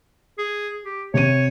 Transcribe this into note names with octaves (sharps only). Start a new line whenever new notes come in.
G#4
G4
C3 C#5 D#7